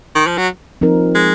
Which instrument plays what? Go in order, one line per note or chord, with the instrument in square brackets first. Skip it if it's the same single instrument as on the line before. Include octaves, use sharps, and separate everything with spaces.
[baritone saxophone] D#3
F3
F#3
[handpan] F3 C4 D#4 A#4
[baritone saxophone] G#3